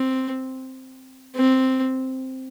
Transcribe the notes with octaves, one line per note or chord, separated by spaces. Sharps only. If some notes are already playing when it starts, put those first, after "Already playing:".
Already playing: C4
C4